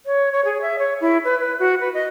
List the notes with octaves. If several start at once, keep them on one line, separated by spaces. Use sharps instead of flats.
C#5
C#5
G#4
E5
C#5
E4
B4
B4
F#4
B4
D#5